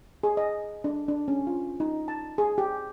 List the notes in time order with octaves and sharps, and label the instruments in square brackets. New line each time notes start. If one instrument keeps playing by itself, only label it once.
[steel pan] G#4
D#5
D4
D4
C#4
F4
D#4
A5
G#4
G4